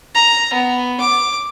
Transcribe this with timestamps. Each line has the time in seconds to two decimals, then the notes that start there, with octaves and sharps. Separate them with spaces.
0.15 A#5
0.53 B3
1.00 D6